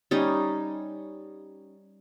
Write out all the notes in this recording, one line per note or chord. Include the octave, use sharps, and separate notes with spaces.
G3 C#4 D#4